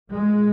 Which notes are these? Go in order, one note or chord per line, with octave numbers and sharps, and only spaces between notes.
A#2 G#3